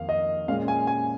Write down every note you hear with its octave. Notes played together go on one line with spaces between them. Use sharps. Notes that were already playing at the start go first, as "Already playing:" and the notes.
Already playing: F2 D#3 A#3 F5
D#5
A#2 G#3 C#4 F5
G#5
G#5